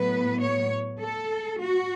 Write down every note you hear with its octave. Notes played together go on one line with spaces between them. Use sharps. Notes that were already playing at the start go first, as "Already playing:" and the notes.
Already playing: A2 F#3 B3 B4
C#5
A4
F#4